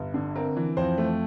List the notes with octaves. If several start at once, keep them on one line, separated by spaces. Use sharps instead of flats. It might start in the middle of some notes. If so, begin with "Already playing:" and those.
Already playing: G1
D3
C4 A#4
E3
F2 C5
A3